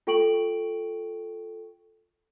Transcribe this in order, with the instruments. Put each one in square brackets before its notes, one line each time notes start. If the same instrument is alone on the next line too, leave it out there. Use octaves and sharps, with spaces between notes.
[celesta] F4 A4 G5 C#6 D7 F#7